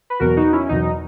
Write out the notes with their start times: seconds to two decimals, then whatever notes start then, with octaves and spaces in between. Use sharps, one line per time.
0.10 B4
0.20 E2 B2 F#3 F#4 A#4
0.37 D#4 F#4
0.53 C#4 E4
0.69 E2 B2 F#3 D#4